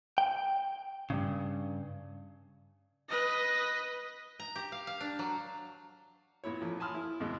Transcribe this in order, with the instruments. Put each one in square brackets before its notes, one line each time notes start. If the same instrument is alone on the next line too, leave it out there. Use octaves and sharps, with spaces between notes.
[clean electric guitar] G5
G2 A#2 C#3
[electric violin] B4 D#5
[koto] A#5
G4
F5
F5
D4
F#3
[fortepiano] A#2 B3 E4 C#5
A1 F3
G#5 A5 B5 C6 D#6 F6
E4
D#2 G#2 B2 G#3